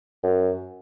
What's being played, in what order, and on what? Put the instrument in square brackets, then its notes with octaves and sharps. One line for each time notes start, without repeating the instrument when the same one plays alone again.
[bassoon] F#2